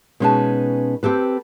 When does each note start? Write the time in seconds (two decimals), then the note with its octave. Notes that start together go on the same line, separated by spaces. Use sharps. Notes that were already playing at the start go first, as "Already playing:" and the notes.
0.20 B2 G#3 C#4 D#4 B4 A5
1.03 C4 G4 A4 B4